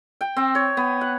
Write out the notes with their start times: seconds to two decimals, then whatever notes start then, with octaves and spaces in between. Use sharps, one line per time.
0.21 G5
0.36 C4
0.55 C#5
0.77 B3
1.01 F#5